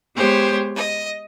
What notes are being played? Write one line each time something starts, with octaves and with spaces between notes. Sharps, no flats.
G#3 B3 G4 C5 C#5
D#5